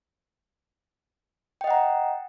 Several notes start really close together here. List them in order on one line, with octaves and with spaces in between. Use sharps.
G5 D#5 F#5 A#5